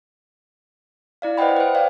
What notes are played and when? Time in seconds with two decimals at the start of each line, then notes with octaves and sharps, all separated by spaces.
1.22 E4 D5 F5
1.37 B4 C5 D#5 F#5 G5 B5
1.56 B4 C5
1.75 D5 F5 G5